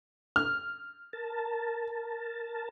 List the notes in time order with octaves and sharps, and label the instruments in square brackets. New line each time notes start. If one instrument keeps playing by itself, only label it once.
[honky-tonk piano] F6
[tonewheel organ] A#4 A5